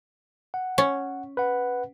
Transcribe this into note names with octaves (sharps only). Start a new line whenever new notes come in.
F#5
C#4
B4 F#5